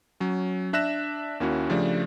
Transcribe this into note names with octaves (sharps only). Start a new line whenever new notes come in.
F#3 C#4
D4 E5 F#6 A#6 E7
D#2 A#3 C#4 E4 F#4
C#3 F3 A3 D4 G4 D5